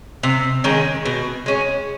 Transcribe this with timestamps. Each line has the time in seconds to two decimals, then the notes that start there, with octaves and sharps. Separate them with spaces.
0.23 C3
0.64 D#3 G#3 C#4
1.05 B2
1.46 G#3 C#4